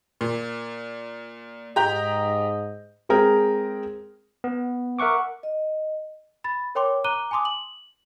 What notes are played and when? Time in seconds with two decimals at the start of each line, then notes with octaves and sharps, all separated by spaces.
0.21 A#2
1.76 G#2 G4 D#5 A#5 G6
3.09 G#3 C4 G#4 A#4 G5
4.44 B3
4.99 A#4 E5 F#5 C#6 D6
5.43 D#5
6.44 B5 A6
6.75 A#4 C#5 G5 C6 D6
7.04 A#5 D6 F#6 D#7 G7
7.31 G#5 A5 C6 D6 D#6
7.45 F#7